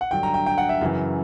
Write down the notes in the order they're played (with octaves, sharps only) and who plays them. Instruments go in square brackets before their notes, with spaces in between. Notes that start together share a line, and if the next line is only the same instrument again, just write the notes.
[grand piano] F#5
G2 D3 F#3 G5
A#5
G5
G5
F#5
E5
F#2 C#3 E3